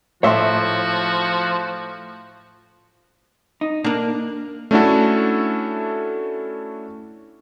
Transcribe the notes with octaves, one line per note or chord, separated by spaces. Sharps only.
A2 F3 F#4 C#5 E5 C6 C#6
D#4
A#3 D4 A#4
A3 C#4 D4 E4 F#4 A4